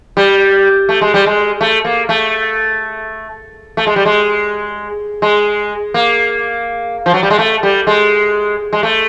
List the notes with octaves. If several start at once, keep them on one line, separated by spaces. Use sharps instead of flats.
G3
A3
G#3
G3
G#3
A3
A#3
A3
A3
G#3
G3
G#3
G#3
A#3
F3
F#3
G3
G#3
A3
G3
G#3
G#3
A3